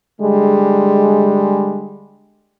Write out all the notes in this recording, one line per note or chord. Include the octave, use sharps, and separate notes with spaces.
D3 G3 G#3